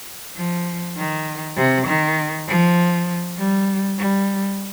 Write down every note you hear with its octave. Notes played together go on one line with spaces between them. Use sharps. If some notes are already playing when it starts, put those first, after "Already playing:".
F3
D#3
C3
D#3
F3
G3
G3